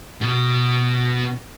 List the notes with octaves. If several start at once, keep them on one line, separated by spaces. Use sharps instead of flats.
B2